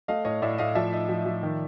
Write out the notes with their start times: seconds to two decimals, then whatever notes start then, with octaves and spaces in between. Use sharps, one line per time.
0.08 A3 D#5 F5
0.25 A2 C#5 D#5
0.42 A2 D5 E5
0.58 A2 D#5 F5
0.75 F3 D5 E5
0.93 D#4
1.09 F3
1.26 F3
1.43 D#3